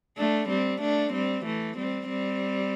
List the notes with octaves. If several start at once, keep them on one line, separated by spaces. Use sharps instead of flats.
A3 D4
G3 C4
A3 D4
G3 C4
E3 A3
G3 C4
G3 C4